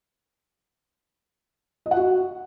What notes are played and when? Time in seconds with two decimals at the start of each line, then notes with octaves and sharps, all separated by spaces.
1.86 D#5
1.91 F#5
1.97 F#4